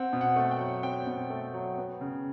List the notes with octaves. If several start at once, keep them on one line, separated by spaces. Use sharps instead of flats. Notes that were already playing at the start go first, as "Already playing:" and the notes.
Already playing: C4 F#5
B2
F#5
A3
G5
F#3
C4 G5
B2
A3
F#3
B3
C#3